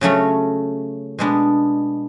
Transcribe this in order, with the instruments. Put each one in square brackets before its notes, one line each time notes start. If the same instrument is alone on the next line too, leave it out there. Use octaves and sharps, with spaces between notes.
[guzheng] C#3 F#3 A3 C#4 F#4
B2 G#3 B3 D4